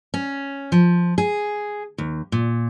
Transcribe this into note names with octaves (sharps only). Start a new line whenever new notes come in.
C#4
F3
G#4
D#2
A#2